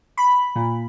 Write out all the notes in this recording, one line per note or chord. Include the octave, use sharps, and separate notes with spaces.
B5
A#2